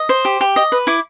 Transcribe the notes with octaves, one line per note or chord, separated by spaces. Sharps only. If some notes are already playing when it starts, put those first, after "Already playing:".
Already playing: D#5
C5
G4
G4
D#5
B4
E4 D6